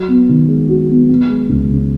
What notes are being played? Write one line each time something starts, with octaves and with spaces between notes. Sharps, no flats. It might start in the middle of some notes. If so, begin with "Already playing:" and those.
Already playing: F#3 F#4
B3
D#3
G#3
F#4
B3
B3
G#3
C#2
C#3